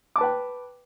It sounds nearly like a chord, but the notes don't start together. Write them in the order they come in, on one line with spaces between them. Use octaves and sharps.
D6 A5 B4 G5